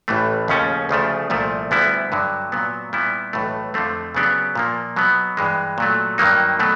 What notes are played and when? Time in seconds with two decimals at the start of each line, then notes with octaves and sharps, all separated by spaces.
0.08 A1 A2 E3 A3
0.48 D#2 C#3 F3 A3 C#4
0.89 D2 C#3 F3 A3
1.30 C2 A#2 F3 A3
1.71 D2 D3 G3 B3 E4
2.12 G2 D3 F#3
2.52 A#2 F#3 B3
2.93 A#2 G3 B3 E4
3.33 B1 A2 E3 A3
3.74 F2 D3 F3 A3 C4
4.15 C#3 F#3 B3 D4 G4
4.55 A#2 F3 A#3
4.96 B2 F#3 B3
5.37 G2 E3 G#3
5.78 A#2 F#3 A3
6.18 G2 D#3 F#3 A#3 D#4
6.59 B2 F#3 A3